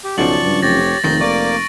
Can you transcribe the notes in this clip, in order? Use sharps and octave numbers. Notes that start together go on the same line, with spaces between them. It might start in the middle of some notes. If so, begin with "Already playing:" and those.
G4
B1 F#2 C#3 F3 D5 A5 C#6 F#7
G2
F1 G4 C#5 A6 A#6
F1 D#2 D#3 G6 A#6
A#3 D5 C#6 D6 D7